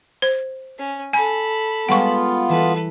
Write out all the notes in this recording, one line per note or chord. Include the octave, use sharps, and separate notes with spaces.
C5
C#4
A4 G#5 B5
G3 G#3 B3 F4 F#5 G5 C#6
E3 A4 B4